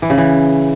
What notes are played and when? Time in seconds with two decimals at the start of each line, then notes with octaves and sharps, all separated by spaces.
0.02 E3
0.10 C#3
0.18 E3